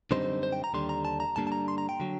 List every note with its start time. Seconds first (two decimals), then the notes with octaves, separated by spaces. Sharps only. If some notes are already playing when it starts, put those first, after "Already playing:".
0.11 F#2 D3 G3 C4 D#4 C5
0.43 C5
0.53 G5
0.64 A#5
0.74 D#2 D3 G3 C6
0.89 A#5
1.05 A5
1.20 A#5
1.36 G2 D3 G3 A#3 D4 A5
1.47 A5
1.52 A#5
1.68 C6
1.78 A#5
1.89 G5
2.00 D3 F#3